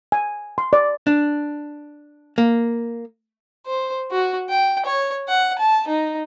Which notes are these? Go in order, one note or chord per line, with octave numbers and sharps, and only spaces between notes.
G#5
C6
D5
D4
A#3
C5
F#4
G5
C#5
F#5
A5
D#4